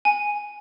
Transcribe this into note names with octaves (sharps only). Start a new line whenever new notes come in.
G#5